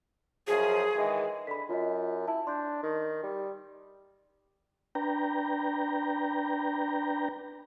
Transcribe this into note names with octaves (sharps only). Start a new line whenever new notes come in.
F#2 C#3 F3 G#4
D#3 E3 G#3
D3 B5 B6
F#2 F4 D#5
E4 A5
D4 C6 G6
D#3
G3
D4 B4 G5 A#5